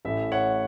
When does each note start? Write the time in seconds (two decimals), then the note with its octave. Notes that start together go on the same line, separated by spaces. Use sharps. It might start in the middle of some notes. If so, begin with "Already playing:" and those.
0.05 A1 A2 A3 E5
0.32 C#5 F#5